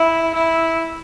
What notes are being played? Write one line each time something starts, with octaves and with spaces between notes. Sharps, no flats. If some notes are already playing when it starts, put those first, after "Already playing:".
Already playing: E4
E4